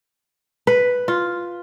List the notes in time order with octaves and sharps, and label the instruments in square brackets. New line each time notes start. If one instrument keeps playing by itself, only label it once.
[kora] B4
F4